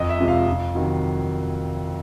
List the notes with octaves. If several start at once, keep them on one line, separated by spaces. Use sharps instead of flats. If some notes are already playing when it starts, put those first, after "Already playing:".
Already playing: F2 D#5
E5
C3 F3 G#3
F5
F2
C3 D#3 F#3